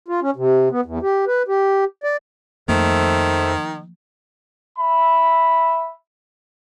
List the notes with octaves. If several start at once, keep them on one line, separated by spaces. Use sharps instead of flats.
F4
C#4
C3
B3
E2
G4
B4
G4
D5
F2 D#3 F3 A3 A#3 A4 C5 E5
E5 B5